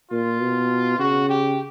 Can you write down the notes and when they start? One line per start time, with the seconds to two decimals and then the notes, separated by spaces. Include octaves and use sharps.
0.11 A#2 F4
0.41 B2
0.99 C#3 F#4
1.29 G4